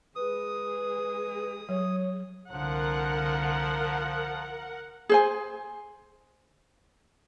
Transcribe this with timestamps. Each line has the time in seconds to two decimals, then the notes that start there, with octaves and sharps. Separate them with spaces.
0.16 G#3 G#4 B4 D#6
1.69 F#3 C#5
2.51 C2 D3 F3 A#4 F#5
5.09 G#4 C5 G#5